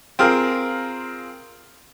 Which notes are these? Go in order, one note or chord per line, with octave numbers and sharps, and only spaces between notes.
C4 F4 G#4 A#4